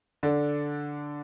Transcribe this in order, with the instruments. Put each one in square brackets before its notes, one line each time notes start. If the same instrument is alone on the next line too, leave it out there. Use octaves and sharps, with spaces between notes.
[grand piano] D3 D4